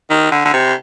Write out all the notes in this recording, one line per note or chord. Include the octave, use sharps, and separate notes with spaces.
D#3
D3
D3
C3